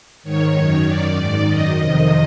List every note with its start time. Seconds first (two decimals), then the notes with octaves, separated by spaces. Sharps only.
0.23 G#2 D#3 C#5
0.55 F#2 D#3
0.85 F#2 D#3 D5
1.17 G#2 D#3
1.48 F#2 D#3 D#5
1.79 F2 C3 D#3